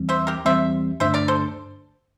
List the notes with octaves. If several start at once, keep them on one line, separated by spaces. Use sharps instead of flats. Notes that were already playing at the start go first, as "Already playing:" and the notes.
Already playing: E2 E3 G3 C4
C5 E5
G4 A#4
E2 E3 G3 C4 C5 E5
G2 D3 A3 D4 C5 E5
A#4 D5
A4 C5